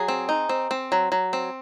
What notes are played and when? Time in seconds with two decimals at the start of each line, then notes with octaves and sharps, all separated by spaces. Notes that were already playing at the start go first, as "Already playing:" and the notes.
Already playing: F#3 G#4
0.08 C4
0.29 D#4
0.49 C4
0.71 C4
0.92 F#3
1.12 F#3
1.33 C4